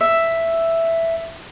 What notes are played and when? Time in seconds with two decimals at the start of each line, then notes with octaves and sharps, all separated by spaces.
0.01 E5